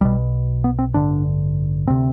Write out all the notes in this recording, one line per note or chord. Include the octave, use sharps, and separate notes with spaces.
B1 B2 G3
B3
C4
A1 G2 D3 D4
D2 C3 C4